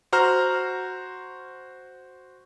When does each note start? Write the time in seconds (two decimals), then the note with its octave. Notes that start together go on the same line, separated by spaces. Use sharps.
0.13 F#4 C5 A#5 F6